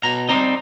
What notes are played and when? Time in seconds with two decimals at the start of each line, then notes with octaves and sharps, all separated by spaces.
0.03 B2 A#5
0.29 G3 C4 D#4 A#5